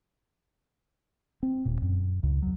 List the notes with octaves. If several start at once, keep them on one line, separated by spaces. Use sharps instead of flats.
C4
D#1 A#2
F#2
C#2 C#3
E2 F#3